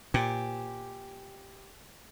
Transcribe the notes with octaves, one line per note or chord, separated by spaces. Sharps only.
A#2 G4 C5 G#5